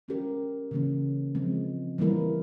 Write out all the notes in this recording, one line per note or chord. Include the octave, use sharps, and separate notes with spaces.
G#3 C#4 G4 A#4
C#3 E3 A#3 C#4
F3 G#3 C4
E3 G3 A#3 E4 A#4